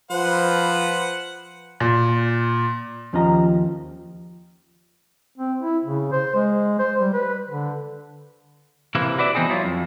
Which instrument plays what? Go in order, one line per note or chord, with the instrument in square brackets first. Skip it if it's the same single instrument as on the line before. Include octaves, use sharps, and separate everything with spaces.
[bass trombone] F3 [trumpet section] B4 [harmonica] C5 F#5
[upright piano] A#2
[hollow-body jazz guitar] D#2 F3 C#4 F4 D#5 A#5
[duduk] C4
E4
C#3
C5
G#3
C5
G3
B4
D3
[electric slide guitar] C3 E3 A#3 E4
F#4 B4 D5 E5
E3 B3 C4 D#4 G#4
F#3 E4 F4
F2